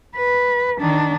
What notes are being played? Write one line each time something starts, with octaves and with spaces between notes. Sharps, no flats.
B4
D#3 D4